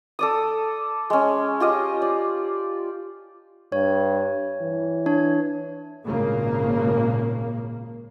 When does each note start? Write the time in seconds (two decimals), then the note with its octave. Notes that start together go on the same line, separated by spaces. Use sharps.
0.19 A4 D5 D#6
1.10 G#3 C#4
1.60 F4 G4 D#5
2.02 D5
3.72 G2 C#5
4.61 E3
5.06 D4 C#5
6.05 G#1 A#2 C#3 A#3